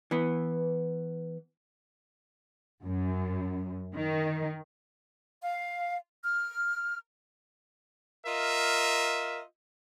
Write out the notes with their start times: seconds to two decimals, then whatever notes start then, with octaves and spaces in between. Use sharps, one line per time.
0.11 E3 B3
2.84 F#2
3.95 D#3
5.42 F5
6.23 F6
8.26 F4 A#4 D#5 E5